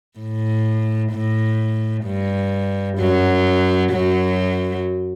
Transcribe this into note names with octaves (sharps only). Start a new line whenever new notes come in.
A2
A2
G2
F#2 F#3
F#2 F#3